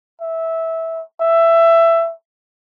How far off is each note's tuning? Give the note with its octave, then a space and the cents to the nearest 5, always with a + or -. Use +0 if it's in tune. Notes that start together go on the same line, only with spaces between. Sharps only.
E5 -15
E5 +15